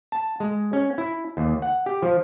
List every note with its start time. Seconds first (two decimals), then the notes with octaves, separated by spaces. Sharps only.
0.12 A5
0.40 G#3
0.73 C#4
0.98 E4
1.37 D#2
1.62 F#5
1.86 G4
2.02 F3